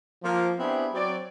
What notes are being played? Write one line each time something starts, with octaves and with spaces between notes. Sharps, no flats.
F3 A#3
B3 C4 D4 E4 G4 G#4
F#3 C4 D5